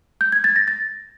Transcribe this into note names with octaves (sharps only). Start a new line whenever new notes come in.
G6
G#6
A6
A#6
A6